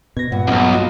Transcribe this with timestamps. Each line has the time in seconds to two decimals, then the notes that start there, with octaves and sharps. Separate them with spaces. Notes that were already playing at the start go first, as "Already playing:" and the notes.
0.17 B2 G#6 A#6
0.32 G2 A#2 F#5
0.47 B1 F#2 D#5 F6
0.73 F4 F#4